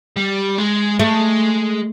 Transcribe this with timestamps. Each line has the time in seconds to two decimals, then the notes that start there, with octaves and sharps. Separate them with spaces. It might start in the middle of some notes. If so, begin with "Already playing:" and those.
0.16 G3
0.58 G#3
1.00 G#3 A3